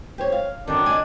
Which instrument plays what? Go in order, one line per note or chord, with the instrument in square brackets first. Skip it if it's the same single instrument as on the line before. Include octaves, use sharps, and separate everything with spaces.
[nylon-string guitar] G4 C5 C#5
F5
[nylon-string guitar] F#2 D3 D#3 [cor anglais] D4
[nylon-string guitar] D#5 G#5